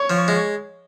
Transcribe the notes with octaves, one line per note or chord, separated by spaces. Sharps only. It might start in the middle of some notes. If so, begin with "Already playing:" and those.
Already playing: C#5
F3
G#3